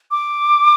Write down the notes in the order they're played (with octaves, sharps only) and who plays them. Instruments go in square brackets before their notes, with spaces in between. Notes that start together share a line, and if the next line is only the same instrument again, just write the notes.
[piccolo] D6